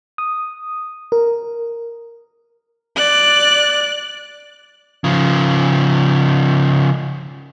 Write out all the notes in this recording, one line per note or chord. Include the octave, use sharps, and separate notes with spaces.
D#6
A#4
D5 F#6
C#3 F3